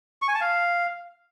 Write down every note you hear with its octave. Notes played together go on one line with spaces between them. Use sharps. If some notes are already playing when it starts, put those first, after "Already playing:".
C#6
G#5
A5
F5